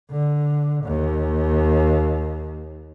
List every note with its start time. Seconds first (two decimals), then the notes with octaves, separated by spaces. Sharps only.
0.11 D3
0.85 D#2